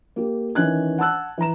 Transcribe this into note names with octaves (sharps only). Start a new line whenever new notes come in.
A#3 G4
D#3 E3 C#4 F#6 G#6
F#5 A5 E6 F#6
E3 B4 A#5 E7